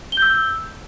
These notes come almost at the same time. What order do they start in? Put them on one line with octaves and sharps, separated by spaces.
G7 G6 E6